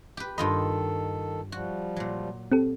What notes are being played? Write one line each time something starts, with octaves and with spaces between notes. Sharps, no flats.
G4 B4
G2 D#3 F4 A4 D#5 B5
F3 G3 F#4
A#2 F#3
C4 G4 A4